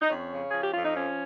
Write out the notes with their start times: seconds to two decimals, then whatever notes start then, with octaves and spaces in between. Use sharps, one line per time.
0.02 D#4
0.10 F2 C#4
0.32 C#3
0.50 F3 G#4
0.62 G4
0.73 F2 F4
0.85 D#4
0.96 F3 C#4